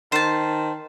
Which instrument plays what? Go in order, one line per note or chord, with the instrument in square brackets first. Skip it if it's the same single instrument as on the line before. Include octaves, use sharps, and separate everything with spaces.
[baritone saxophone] D#3 [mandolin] C5 A5